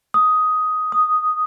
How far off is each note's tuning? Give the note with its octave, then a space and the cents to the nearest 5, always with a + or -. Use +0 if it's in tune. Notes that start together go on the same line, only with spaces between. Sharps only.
D#6 +10
D#6 +0